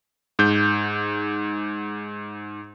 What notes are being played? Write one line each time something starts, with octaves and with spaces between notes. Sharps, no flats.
G#2 G6